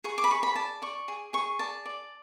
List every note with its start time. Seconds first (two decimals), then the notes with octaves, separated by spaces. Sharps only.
0.04 G#4 C#6
0.18 D6
0.24 B5
0.30 G#4 C#6
0.43 B5
0.56 D5 A5
0.82 D5 C#6
1.08 G#4
1.33 G#4 C#6
1.59 D5 A5
1.86 D5